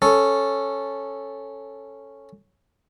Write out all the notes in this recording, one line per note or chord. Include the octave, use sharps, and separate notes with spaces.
C#4 A4